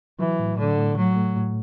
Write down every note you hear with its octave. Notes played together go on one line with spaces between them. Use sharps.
E3 F#3
A2
A2 D3
A2
F#3 A3
A3
A2